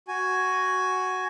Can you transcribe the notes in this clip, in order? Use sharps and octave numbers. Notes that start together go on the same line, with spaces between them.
F#4 G#5